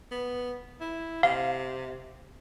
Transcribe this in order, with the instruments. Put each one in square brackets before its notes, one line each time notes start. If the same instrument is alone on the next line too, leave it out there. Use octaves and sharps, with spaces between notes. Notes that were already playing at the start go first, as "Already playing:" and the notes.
[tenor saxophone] B3
E4
[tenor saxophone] C3 [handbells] F5